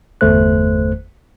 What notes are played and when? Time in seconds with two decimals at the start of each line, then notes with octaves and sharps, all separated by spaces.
0.21 G1 E2 A3 C5 F#6